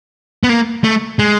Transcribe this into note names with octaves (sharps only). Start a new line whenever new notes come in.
B3
A#3
A3
G#3